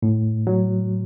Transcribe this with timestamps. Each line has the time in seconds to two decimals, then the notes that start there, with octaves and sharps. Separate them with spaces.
0.02 A2
0.47 F#3